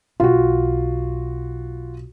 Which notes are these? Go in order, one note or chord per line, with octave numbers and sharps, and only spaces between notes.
B1 F4 F#4